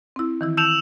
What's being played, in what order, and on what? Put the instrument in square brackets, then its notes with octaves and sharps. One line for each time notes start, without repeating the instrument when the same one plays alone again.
[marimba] C4 E4
D#3 E3 E4
[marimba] A5 G6 [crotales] E6 E7 F7